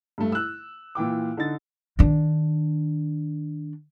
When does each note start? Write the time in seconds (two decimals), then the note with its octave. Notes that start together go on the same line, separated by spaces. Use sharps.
0.18 G2 A3
0.32 E6 F#6
0.95 A#2 E3 G5 D6
1.37 D3 D#4 A6
1.99 D#3 D4